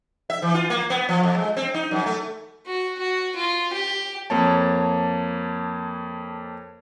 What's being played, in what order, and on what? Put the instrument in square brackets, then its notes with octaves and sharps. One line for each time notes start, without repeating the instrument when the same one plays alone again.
[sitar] E5
E3
F4
A#3
B3
F3
F2
G#3
C4
D#4
F#2
A3
[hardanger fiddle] F#4
F#4
F4
G4
[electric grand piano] F2 A#3 C#5 A5